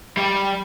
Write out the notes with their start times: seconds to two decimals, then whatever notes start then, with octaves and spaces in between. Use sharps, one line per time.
0.17 G3